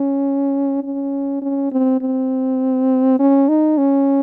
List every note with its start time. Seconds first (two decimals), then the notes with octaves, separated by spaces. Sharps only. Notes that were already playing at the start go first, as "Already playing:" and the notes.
Already playing: C#4
0.83 C#4
1.41 C#4
1.72 C4
2.01 C4
3.19 C#4
3.49 D#4
3.78 C#4